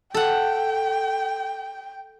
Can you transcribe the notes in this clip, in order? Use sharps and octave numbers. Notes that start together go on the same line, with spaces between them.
A4 F#5 G5